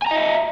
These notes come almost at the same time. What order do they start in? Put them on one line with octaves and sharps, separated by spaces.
G#5 A#5 D#5 E5